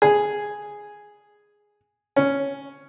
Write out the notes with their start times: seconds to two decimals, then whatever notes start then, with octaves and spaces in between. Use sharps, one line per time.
0.02 G#4
2.16 C#4